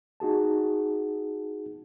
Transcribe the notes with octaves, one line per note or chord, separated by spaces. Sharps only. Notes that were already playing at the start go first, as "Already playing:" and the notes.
D#4 F#4 G#4 A5